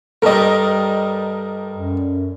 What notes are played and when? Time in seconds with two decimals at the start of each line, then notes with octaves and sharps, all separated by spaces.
0.22 G2 G3 A4 A#4 D#5
1.75 F#2